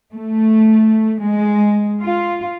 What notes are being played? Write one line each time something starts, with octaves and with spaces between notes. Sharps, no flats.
A3
G#3
F4